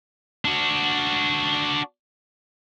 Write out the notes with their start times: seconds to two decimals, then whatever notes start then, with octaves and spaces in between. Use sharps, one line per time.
0.45 D4 F#4